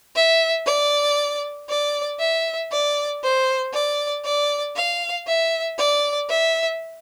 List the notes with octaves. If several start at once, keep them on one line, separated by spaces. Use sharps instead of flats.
E5
D5
D5
E5
D5
C5
D5
D5
F5
E5
D5
E5